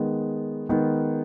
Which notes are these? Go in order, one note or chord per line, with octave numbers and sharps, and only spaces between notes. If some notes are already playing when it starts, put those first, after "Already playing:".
Already playing: D#3 G#3 B3
D#3 G#3 B3